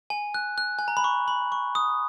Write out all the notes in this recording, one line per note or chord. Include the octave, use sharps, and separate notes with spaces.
G#5
F#6
F#6
G#5
A#5
B5
C#6
B5
C#6
D#6